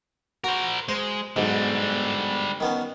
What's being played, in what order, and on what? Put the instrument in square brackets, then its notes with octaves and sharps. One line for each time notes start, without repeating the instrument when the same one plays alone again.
[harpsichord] F#4 [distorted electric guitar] A#4 C5
[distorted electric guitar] G#3 [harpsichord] C5
[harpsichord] B1 G#2 [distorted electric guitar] D3 G3
[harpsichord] D#3 B3 C#4